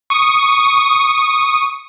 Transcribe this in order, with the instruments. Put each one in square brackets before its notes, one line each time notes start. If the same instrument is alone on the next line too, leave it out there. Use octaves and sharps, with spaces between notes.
[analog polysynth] C#6 D#6